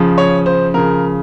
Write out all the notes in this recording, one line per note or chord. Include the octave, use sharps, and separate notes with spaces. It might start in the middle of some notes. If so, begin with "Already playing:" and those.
Already playing: C#3 F3
C#5
C5
C#3 F3 A#4